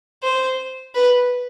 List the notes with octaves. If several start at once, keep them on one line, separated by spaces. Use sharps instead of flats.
C5
B4